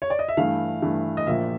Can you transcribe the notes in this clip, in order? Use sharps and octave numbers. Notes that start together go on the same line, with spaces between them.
C#5
D5
D#5
E5
G2 E3 A3 F5
G2 E3 A3
D#5
A#1 A#2 F3 A#3 E5